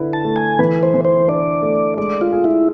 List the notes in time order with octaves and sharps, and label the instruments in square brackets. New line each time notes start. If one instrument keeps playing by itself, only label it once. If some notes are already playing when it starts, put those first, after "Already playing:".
Already playing: [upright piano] D3 E4 B4
[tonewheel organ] A5
[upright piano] A3
[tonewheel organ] G#5
[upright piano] E3 [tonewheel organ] B4
[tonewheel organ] C5
[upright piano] E3
[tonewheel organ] C5
[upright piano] D4 [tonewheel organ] D5
[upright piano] A3
[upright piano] G#3 [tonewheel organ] D5
[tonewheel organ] F4
[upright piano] G#4
[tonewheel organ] E4